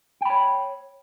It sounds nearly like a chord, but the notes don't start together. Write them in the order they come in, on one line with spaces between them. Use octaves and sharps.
G5 B5 C#5